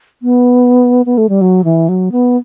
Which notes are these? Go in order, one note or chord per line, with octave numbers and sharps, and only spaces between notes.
B3
B3
A3
G3
F#3
E3
F#3
B3